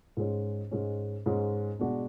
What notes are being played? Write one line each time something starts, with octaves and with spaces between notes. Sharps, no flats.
G#2 G#3 C#4
G#2 G#3 C#4
G#2 G#3 C#4
B2 G#3 D4 F#4